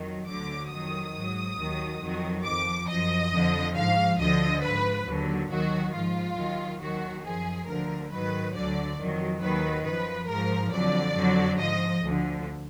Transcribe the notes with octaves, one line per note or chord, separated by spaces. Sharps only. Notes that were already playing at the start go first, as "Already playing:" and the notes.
Already playing: F2 D#3 F#3
D2 D3 F#3 D6
F2 D#3 F#3 D#6
G#2 F#3
D#2 D#3 F#3
F2 D#3 F#3
F2 F3 D6
F#2 F3 D#5
F2 D3 F3
G#2 F3 F5
D2 D3 F3 D#5
G#2 F3 B4
D#2 D3 F#3
D#2 D#3 F#3 F#4
G#2 F3 F4
D#2 D#3 F#3
D#2 D#3 F#3 F#4
F#2 F3 G#4
D2 D3 F3 A#4
G#2 D#3 F#3 B4
D2 D3 F#3 D5
F2 D#3 F#3
D#2 D#3 F#3 B4
F#2 F3 B4
G#2 F3 A#4
F2 D3 F#3 D5
F2 D3 F#3
G#2 F3 D#5
D2 D3 F3